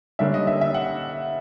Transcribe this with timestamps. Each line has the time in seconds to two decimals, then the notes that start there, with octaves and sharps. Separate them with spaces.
0.19 D3 G3 A#3 C#4 E5
0.34 D#5
0.47 E5
0.61 E5
0.74 F#5